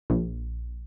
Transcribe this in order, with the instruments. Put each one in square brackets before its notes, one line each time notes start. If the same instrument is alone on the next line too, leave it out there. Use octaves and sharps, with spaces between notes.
[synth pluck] A#1